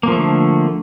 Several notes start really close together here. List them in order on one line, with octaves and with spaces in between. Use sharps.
A#3 F3 A3 D3